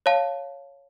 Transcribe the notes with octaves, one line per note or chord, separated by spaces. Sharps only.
C#5 F5 A5